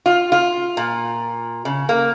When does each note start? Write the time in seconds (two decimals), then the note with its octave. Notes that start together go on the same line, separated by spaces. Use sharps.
0.06 F4
0.32 F4
0.77 A#2
1.65 C#3
1.89 A#3